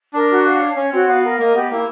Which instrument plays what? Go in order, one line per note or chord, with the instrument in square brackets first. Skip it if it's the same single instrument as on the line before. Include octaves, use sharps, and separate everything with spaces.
[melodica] D4 [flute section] A#4
[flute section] F#4
F5
C#5
[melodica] C#4 [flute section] C#5
[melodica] C4 [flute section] F#4
[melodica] B3 [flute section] F5
[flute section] A#4
[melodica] A#3 [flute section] D#5
[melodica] B3 [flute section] G4
[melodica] A#3 [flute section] E4